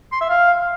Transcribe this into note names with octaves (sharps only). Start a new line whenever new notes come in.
C6
E5
F5